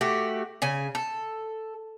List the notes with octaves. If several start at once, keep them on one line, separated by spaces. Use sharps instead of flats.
A3 F#4 G4
C#3 G#5
A4